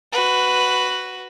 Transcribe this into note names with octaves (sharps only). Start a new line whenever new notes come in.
F#4 B4